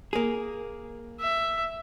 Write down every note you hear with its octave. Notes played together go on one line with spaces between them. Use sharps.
A#3 G#4
E5